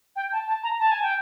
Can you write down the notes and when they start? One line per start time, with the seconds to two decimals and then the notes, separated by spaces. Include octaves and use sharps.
0.16 G5
0.32 A5
0.48 A5
0.63 A#5
0.80 A5
0.91 G#5
1.03 G5